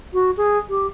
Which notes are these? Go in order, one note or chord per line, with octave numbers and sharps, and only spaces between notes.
F#4
G#4
G4